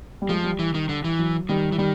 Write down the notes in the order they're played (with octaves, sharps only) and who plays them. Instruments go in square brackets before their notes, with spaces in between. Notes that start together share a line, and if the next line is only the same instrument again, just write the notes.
[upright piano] G3
[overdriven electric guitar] F3 [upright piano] G#3
[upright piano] G3
[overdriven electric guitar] E3
D#3
D3
E3
[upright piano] F#3
[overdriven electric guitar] D#3 [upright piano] G3
[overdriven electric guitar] E3
[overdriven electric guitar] D#3 [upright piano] G3